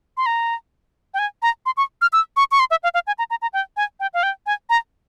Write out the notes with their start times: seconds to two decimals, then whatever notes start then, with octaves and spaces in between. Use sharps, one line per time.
0.17 C6
0.26 A#5
1.14 G5
1.19 G#5
1.42 A#5
1.66 C6
1.77 C#6
2.02 F6
2.13 E6
2.37 C#6
2.51 C#6
2.60 C6
2.71 E5
2.83 F5
2.94 F5
3.07 G#5
3.19 A#5
3.30 A#5
3.42 A#5
3.53 G5
3.77 G#5
4.00 G5
4.14 F5
4.23 G5
4.46 G#5
4.70 A#5